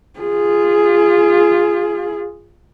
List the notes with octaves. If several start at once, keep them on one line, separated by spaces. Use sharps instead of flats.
F4 G#4